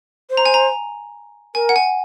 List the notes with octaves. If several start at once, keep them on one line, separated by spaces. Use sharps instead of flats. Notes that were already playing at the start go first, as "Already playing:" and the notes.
C5
A#5
G#5
A#5
A#4 G#5
F#5
G#5